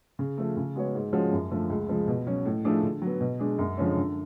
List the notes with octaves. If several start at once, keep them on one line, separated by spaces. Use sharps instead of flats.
C#3
F3 A3
C#3
G#3 B3 F#4 C#5
G#2
F3 G#3 C#4 F#4
F#2
D3 F3 A3
C#2
C#3 F3 G#3
B2
F#3 C#4
A2
F3 A3 D4 G#4
D3
F#3 B3
B2
G#3 D4 G#4
F#2
D3 F3 G#3 C#4
D3